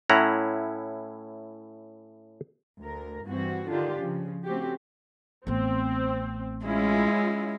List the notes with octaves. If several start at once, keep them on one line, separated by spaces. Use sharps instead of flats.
A2 C#4 E4 F#5 A#5
D2 A#4
G2 E3 C4 F#4
D3 D#3 D4 F4 G4
C#3 F3
A3 C4 C#4 F#4 G4
A1 B3 C4
G#3 C#4 E4 F4